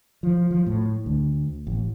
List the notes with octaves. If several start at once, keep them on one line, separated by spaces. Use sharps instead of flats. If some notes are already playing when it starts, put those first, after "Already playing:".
F3
F3
A2
D2
A1